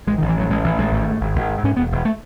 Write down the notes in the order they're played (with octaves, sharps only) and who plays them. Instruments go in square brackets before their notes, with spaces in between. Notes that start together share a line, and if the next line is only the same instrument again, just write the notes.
[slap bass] A1 G#3
D#3
A1
E3
A1 F#3
A1 G#3
A1 E3
A1 G#3
G#1 A3
G#2
G#1
G#1
G#2
G#2 C#4
E1 B3
E1
A3